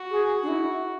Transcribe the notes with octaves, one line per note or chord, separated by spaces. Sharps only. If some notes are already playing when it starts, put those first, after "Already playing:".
Already playing: F#4
G#4
D4
E4